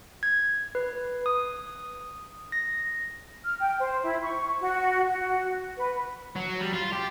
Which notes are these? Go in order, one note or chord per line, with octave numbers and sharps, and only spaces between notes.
G#6
B4
D#6
A#6
F6
G5
C5
E4
C#6
F#4
F#4
B4
F#3
G3
F4
G4